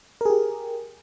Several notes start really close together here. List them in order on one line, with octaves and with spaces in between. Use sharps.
A#4 G#4 G4